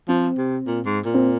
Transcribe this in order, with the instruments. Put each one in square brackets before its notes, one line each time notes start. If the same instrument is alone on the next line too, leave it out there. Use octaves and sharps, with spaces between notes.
[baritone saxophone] F3 [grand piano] C4
[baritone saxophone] C3
A#2
G#2
A#2
[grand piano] C4